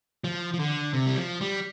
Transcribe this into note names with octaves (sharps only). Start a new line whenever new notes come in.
F3
F3
D3
C3
G3
F3
G3